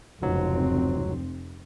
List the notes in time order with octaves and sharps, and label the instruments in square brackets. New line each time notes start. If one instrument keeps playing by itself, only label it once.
[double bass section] F1 C4 [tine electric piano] C#2 G#2 F#3